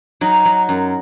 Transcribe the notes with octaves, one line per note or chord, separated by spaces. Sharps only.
F#3 D#4
F#3
F#2